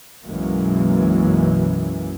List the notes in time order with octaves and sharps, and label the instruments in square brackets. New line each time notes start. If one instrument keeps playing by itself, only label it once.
[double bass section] B1 F#2 E3 G#3 A#3